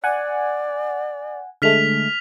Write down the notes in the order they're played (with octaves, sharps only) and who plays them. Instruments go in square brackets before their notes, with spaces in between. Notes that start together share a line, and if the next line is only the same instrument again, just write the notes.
[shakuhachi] D5 [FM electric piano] F#5 G#5
[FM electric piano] D3 G#3 A3 [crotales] F6 B6 F7